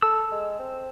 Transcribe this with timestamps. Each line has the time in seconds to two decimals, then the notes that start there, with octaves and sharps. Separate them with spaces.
0.02 A4 E6
0.32 G#3
0.59 C4